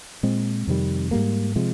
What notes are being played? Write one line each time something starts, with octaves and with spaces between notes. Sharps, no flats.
A#2 G#3 C4
F2 C3 D#3 G3
G#2 G3 A#3
C3 F3 G#3